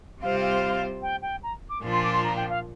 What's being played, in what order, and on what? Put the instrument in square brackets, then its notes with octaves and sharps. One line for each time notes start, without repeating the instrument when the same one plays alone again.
[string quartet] C3 G3 C4 F4 C5 [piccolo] F5
[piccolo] F5
G5
G5
A#5
D6
[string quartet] A#2 F3 D4 F4
[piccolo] C6
D6
C6
A#5
G5
F5